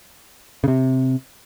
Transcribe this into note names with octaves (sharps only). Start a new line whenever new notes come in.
C#3
C3